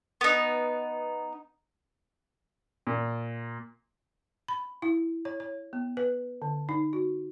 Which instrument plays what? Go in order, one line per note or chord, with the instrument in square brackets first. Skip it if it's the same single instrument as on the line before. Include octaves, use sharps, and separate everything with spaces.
[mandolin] B3 D#4
[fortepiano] A#2
[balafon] B5
E4
C#5
C#5
B3
B4
D3
D#4
F#4